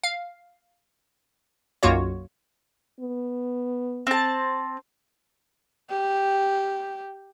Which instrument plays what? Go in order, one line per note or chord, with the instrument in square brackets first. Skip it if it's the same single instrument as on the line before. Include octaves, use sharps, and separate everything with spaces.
[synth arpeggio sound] F5
B1 F#2 A#3 F4 F#4 C#5
[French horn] B3
[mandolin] C4 A5
[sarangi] G4